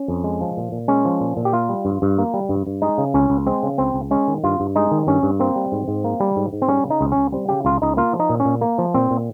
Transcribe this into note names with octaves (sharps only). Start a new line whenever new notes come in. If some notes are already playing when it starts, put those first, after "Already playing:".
Already playing: C#4
F2
G#3
F3
A#2
A#2
G#3 C#4
F3
A#2
A#2
G4
A#3 F4
G3
G2
G2
A#3
G3
G2
G2
G#3 D#4
C#3
C#2 C#4
C#2
G#3 C4
C#3
C#2 C4
C#2
G#3 C#4
D#3
G2 F4
G2
G#3 D#4
D#3
G2 C#4
G2
A#3 C4
G3
G#2
G#2
A#3
G3
G#2
G#2
C4
G3 C#4
C#3
D#4
C#2
C#2 C#4
G3 C4
C#3 G4
C#2 F4
C#2 D#4
A#3 F4
F3
D#4
A#2
C#4
A#2
A#3
F3
A#2 C4
A#2